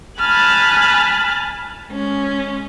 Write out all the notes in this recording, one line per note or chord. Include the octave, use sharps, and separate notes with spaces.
G#5 A5 B5 F6 F#6 A6
G#3 C#4